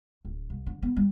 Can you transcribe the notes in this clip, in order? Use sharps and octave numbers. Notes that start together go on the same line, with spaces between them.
D1
C2
D3
B3
G3